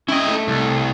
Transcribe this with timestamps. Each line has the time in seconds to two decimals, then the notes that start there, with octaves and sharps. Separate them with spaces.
0.08 C#4 D4 E4 D#5 G5
0.28 A3
0.48 C2